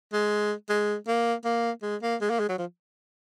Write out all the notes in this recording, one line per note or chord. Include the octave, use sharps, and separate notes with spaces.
G#3
G#3
A#3
A#3
G#3
A#3
G#3
A#3
G#3
F#3
F3